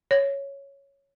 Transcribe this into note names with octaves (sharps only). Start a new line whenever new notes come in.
C#5